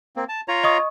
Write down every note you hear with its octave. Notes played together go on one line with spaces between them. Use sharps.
A#3 C4
A5
F4 C#5 A#5
D#5 C#6 D#6